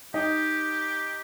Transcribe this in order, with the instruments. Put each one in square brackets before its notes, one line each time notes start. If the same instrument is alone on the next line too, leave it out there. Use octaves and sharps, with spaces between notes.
[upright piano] D#4 D#5 [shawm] G4